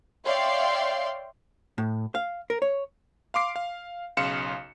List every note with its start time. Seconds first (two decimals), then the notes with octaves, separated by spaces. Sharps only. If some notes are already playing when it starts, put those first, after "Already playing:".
0.24 C#5 D5 E5 F5 G5 C6
1.78 A2
2.15 F5
2.50 A#4
2.62 C#5
3.34 F5 C6 D6 C7
3.56 F5
4.17 B1 C#3 F5 C6 C#7 E7